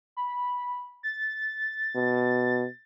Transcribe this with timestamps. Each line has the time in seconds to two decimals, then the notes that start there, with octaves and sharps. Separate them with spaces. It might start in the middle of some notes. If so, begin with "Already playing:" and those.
0.17 B5
1.03 A6
1.96 B2